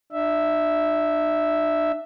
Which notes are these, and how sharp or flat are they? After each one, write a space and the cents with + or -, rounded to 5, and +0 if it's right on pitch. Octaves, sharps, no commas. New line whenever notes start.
D4 +40 E5 +0